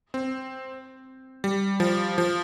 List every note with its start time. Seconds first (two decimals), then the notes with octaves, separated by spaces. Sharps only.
0.14 C4
1.44 G3
1.80 F3
2.18 F3